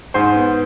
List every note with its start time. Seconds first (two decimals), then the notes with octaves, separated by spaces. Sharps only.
0.14 G#2 C5 C6
0.36 B3